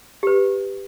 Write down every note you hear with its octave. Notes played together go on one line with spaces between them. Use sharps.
G4 B4